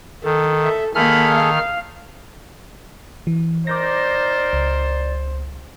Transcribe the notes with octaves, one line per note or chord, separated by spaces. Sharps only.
D#3 A4
E5
D#3 A#3 G#4 A4 B5 F6
F5
E3
D#4 A#4 C5 D5 D6 G6 A#6
C#2